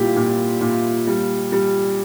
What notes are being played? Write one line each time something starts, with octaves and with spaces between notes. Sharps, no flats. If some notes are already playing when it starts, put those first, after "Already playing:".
Already playing: A#2 G3 E4 F4 G4
A#2
A#2
G3
G3